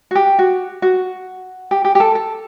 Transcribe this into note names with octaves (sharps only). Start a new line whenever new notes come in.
F#4
G4
F#4
F#4
G4
G4
G4
A4
A4